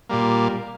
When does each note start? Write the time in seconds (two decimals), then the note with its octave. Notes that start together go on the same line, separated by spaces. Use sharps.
0.09 A#2 G3 A#3